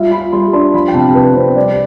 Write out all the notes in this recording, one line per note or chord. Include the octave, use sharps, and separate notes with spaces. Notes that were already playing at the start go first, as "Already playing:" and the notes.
Already playing: G3 F4 E5
F4 B5
G3 C6
D4 C6
F3 B5
G5
C3 A5
C3 B4
C3 C5
G3 D5